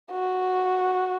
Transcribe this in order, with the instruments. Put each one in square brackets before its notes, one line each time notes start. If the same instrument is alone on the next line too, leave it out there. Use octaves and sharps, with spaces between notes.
[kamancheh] F#4